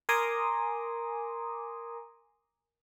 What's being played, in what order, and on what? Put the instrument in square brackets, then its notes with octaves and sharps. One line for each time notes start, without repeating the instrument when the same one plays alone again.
[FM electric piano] A#4 G#5 A#5 C6 D6 D#6